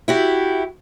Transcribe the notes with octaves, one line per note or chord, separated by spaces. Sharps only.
E4 F#4 G4